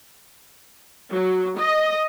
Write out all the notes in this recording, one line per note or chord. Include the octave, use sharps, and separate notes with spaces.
F#3
D#5